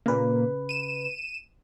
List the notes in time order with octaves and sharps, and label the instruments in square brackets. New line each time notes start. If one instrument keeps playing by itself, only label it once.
[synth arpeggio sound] A#2 A#3 [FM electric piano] C#3 B4
[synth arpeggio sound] D#7 E7